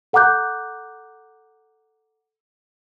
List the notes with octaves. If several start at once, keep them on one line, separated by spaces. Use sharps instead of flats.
A4 F#5 A#5 D6 F#6 G6